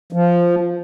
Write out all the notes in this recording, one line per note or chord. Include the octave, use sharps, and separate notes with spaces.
F3